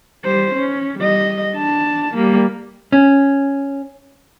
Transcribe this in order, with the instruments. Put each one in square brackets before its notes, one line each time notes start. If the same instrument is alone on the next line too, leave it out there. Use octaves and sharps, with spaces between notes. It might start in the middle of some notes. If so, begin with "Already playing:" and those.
[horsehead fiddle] G3 C5
C#4
G3 D#5
D4 A5
G3 A#3
[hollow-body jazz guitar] C#4